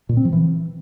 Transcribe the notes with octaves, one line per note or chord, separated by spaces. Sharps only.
A#2
C4
F3
E3